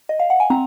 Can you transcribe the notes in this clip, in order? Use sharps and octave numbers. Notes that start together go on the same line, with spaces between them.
D#5
F5
F#5
G#5
C4 A#5